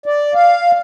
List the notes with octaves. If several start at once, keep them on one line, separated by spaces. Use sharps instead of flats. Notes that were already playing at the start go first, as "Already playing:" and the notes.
D5
F5